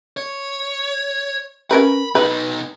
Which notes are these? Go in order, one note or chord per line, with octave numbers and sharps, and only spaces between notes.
C#5
C#4 A#4 B4 B5
B2 D#4 B4